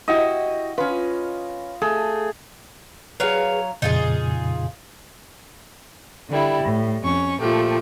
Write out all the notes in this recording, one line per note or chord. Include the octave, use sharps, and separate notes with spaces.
E4 F#4 G4 D#5
C#4 F4 B4
A3 G#4
F#3 G#4 B4 C#5 F5
F2 A#2 C#3 D#4 F4 G#4
D3 G3 E4
A2
F2 C#4 C#6
A#2 F3 A3 G4